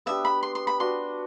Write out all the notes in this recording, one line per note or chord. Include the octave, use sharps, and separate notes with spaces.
B3 D4 G4 E5
B5
C6
C6
B5
D4 F#4 B4 C6